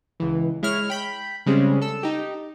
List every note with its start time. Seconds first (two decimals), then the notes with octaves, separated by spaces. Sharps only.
0.20 C#2 E3
0.63 G#3 E4 C#5 F6
0.90 G5 B5 G6
1.46 C#3 G3 G#3 C4 C#4
1.82 A4 E6
2.03 D#4 G4